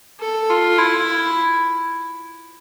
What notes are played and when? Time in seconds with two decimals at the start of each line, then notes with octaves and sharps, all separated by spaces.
0.20 A4
0.50 F4
0.78 E4